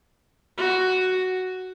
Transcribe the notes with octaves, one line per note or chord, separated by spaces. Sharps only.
F#4